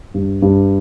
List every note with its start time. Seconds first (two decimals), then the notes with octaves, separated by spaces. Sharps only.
0.14 G2
0.42 G2